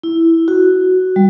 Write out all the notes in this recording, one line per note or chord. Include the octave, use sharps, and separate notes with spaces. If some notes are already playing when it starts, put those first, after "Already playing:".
E4
F#4
G3